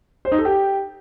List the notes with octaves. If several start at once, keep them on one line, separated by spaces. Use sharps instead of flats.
C5
D#4
A4
G4